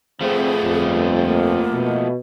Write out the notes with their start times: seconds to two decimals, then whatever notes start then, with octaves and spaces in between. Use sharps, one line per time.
0.21 F3 A3 B3 C4 G#4
0.64 G1 F2
1.22 A#3
1.73 B2